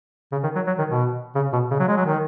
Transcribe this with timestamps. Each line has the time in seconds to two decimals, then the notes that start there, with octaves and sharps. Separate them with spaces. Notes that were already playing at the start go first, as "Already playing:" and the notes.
0.32 C#3
0.43 D#3
0.55 F#3
0.67 F#3
0.78 D#3
0.90 B2
1.35 C#3
1.53 B2
1.71 C#3
1.79 F#3
1.88 G#3
1.97 F#3
2.06 D#3